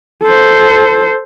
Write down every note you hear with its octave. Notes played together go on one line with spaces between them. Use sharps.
A4 C5